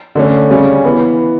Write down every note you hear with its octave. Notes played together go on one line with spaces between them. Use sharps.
D3 A3 C#4
C#3 G3 C#4
E3 B3